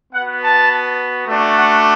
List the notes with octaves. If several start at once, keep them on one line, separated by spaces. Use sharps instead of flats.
B3 F#4 F#5
A5
A3 D4 F#4
F#5